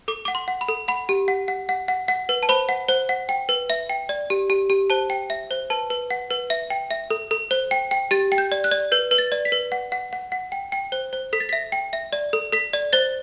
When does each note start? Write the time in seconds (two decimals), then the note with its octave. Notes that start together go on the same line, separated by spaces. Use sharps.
0.08 A4 D6
0.25 F#5 D6
0.35 C6
0.48 F#5
0.61 B5
0.68 A4
0.88 F#5 B5
1.09 G4
1.28 F#5
1.48 F#5
1.69 F#5
1.88 F#5
2.08 F#5
2.29 B4
2.43 A5
2.49 C5 B5
2.69 F#5
2.88 C5
3.09 F#5
3.29 G5
3.49 B4
3.70 E5
3.90 G5
4.09 D5
4.30 G4
4.50 G4
4.70 G4
4.90 C5 A5
5.10 G5
5.30 E5
5.51 C5
5.70 B4 A5
5.90 B4
6.11 F#5
6.31 B4
6.50 E5
6.70 G5
6.91 E5
7.10 A4
7.31 A4
7.51 C5
7.71 G5
7.91 G5
8.11 G4 A6
8.32 G5
8.38 G6
8.52 D5
8.64 F#6
8.71 D5
8.92 B4 G6
9.11 B4
9.18 A6
9.32 D5
9.45 B6
9.52 B4
9.72 F#5
9.92 F#5
10.13 F#5
10.32 F#5
10.52 G5
10.72 G5
10.92 C5
11.13 C5
11.33 A4 B6
11.40 A6
11.49 E5 B6
11.72 G5
11.93 E5
12.13 D5
12.33 A4
12.52 A4 B6
12.73 D5
12.93 C5 A6